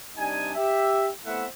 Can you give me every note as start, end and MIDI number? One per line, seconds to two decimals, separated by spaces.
0.17 0.52 48
0.17 0.52 55
0.17 0.52 62
0.17 0.52 63
0.17 0.52 80
0.55 1.09 67
0.55 1.09 76
1.25 1.45 57
1.25 1.45 59
1.25 1.45 60
1.25 1.45 64
1.25 1.45 76
1.25 1.45 78